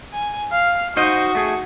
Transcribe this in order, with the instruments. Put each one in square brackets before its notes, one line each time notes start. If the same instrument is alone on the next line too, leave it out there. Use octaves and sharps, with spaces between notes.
[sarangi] G#5
F5
[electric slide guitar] D#4 C5 D#5 [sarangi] F#4
[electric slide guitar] A3 G#4